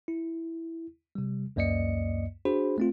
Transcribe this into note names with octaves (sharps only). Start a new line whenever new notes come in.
E4
C3 G3
C#2 F#2 A#3 D5 D#5 C#7
D4 F#4 G#4 C5 B5
A3 C4 F4